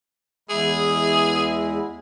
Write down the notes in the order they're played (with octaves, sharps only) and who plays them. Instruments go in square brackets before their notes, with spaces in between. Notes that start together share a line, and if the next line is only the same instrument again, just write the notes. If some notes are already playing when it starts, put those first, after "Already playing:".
[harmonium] E2 G#3 E4 [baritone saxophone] G#4